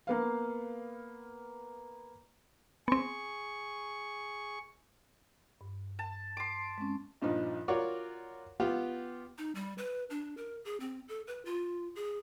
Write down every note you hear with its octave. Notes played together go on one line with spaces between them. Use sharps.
A#3 B3 F5
B3 C4 G#4 C#6
G2
A5
C6 D6
G#3 C4 C#4
A#1 G2 F3 D#4
F4 F#4 A#4 C#5 D5
B3 F4 G4
D#4
G3
B4
D4
A#4
G#4
C4
A4
B4
F4
G#4